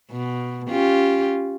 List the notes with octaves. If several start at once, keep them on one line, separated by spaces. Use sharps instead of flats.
B2
C#4 F4 G4